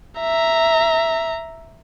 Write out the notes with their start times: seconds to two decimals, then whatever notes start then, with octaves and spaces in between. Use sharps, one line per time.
0.20 E5 A#5